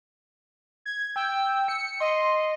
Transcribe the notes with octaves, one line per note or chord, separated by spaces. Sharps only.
G#6
G5 E6
C#7
D#5 C6